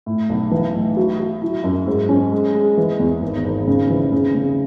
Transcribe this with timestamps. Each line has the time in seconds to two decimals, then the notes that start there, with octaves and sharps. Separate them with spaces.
0.06 A2
0.30 B1
0.51 E3
0.74 A2
0.97 F#3
1.19 F#3
1.42 E4
1.64 F#2
1.87 G#2
2.09 C#4
2.32 G#3
2.55 G#3
2.77 E3
2.99 E2
3.22 G#1
3.44 G#1
3.67 C#3
3.90 E3
4.12 C#3
4.35 C#3